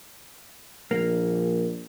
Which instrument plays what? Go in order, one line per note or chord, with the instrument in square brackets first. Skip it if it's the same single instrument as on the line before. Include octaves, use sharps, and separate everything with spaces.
[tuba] A#1 [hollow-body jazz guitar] A#3